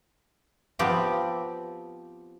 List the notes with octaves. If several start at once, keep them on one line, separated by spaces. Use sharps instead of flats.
F3 B3 C4 G4